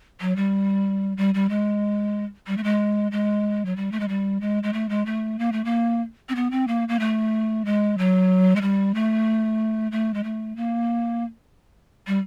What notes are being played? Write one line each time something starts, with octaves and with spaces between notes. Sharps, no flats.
F#3
G3
G3
G3
G#3
G3
A3
G#3
G#3
F#3
G3
A3
G#3
G3
G#3
G#3
A3
G#3
A3
A#3
A3
A#3
C4
B3
C4
A#3
A#3
A3
G#3
F#3
G#3
G3
A3
A3
G#3
A3
A#3
G3